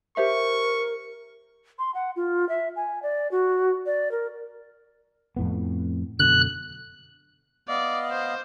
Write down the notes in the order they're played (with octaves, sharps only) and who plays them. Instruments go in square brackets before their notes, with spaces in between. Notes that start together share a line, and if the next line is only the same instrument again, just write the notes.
[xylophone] G4 C5 E5 [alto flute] A#4 [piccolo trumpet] C#6
[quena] C6
F#5
F4
E5
G#5
D5
F#4
D5
A#4
[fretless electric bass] F2 A2 B3
[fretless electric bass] F#2 B2 D3 [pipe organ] F#6
[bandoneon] B3 D#5 F5 [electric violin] D5
[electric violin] C5